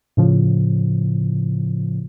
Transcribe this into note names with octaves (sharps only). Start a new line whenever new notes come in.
A2 C#3 F3